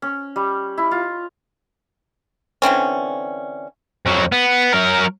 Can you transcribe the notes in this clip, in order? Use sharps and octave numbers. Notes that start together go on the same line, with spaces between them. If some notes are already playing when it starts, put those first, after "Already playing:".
C#4
G3
E4
F4
D3 E3 C4 C#4
F2 F#3
B3
F#3 A#4